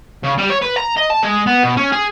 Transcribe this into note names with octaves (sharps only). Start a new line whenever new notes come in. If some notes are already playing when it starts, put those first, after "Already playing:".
C#3
G3
C#5
B4
A#5
D#5
A5
G#3
B3
B2
C#4
G#4